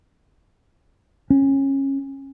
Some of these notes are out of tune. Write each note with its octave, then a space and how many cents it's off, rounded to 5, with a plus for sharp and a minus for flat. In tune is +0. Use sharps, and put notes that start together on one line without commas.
C#4 -20